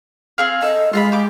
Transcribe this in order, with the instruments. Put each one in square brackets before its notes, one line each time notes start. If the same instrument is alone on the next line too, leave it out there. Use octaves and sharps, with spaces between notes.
[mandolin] C4 G#4 F5
[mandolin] A4 [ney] D#5
[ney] G#3 [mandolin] F4 A#5 B5
[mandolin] G4 D6